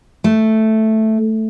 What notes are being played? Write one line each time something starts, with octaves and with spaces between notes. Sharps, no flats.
A3